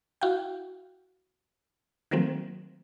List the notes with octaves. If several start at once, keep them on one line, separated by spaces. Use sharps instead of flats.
E4 F#4 F5 G5
D#3 F3 F#3 A3 A#3 C4